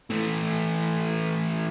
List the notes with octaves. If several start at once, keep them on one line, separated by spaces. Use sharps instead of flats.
E3 A3